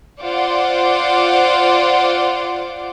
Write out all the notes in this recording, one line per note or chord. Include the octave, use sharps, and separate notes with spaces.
F4 C5 D5 F#5 D6